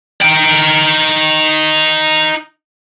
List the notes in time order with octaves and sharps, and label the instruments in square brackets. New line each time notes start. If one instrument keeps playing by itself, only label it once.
[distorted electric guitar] D#4 G5